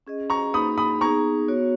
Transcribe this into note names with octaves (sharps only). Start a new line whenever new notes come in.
C#4 G#4 D#5
A#5 C#6
A#3 D#4 G#4 B5 D#6
B5 D#6
B3 D#4 G#4 A#5 C#6
B3 F#4 C#5